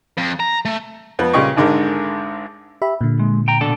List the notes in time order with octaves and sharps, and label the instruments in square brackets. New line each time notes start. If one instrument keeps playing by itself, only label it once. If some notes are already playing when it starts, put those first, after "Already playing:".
[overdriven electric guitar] F2
A#5
A3
[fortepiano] F2 B3
A#2 C#3 G3 D#5 G5 C#6
G#1 G#2 D3 G#3 A#4
[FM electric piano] G4 E5 B5
A#2 D3
[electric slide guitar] G#3
G5 A#5
B2 D4 A4